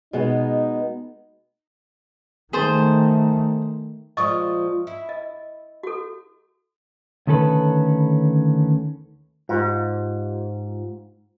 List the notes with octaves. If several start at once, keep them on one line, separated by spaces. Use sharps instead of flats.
B2 G#3 B3 D#4
D#3 A3 G#4 C5 A5
A#2 F3 G#3 D#5 C#6 D#6
E4
D#5
F#4 A4
D2 D#3 C#4 A4 B4
G#2 F4 G4